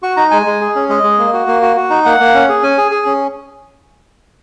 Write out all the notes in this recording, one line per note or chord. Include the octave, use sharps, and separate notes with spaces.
F#4 C#6
D#4 A#5
G#3 G#5
G#3
G#4
C#4
G#3 D#5
G#3
A#3
F#4
A#3
F#4
F#4
D#4
A#3 F#5
A#3
C#4
G#4
C#4 G#5
G#4
G#4
C#4